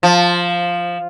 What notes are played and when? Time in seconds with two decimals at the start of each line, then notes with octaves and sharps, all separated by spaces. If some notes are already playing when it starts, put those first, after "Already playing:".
0.03 F3